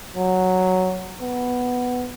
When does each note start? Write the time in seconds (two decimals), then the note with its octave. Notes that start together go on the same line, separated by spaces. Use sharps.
0.16 F#3
1.21 B3